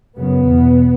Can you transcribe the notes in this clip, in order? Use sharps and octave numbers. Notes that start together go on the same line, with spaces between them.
F#2 C#3 B3
E2 B2